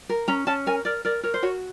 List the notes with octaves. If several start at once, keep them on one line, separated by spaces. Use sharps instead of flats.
A#4
C#4 A#5
C#4 A5
A#4 G#5
A#4 D5
A#4 D5
A#4 C#5
C5
F#4 C#5